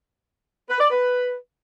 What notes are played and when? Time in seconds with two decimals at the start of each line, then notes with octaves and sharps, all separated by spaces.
0.70 B4
0.80 D5
0.90 B4